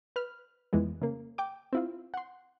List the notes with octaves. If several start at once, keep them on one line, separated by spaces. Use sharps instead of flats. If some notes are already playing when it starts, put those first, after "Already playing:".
B4 F6
F2 E3 G#3 B3
C#3 A#3
G5 D6
C4 E4 F4
F#5 C6